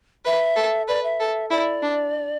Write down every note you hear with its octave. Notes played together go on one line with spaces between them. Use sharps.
B4 E5
A4
B4 D5
E5
A4
E4 D5
D4